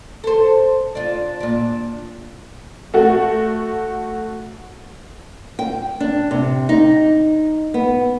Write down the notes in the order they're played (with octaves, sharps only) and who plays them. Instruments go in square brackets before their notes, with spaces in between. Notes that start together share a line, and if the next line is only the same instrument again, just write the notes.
[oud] A4 C5
D4 F4
A#2 D4
[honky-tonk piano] A3 F#4
[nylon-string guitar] G5
D4
C3
D#4
B3